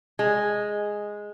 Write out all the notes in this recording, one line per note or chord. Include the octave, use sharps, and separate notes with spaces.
G#3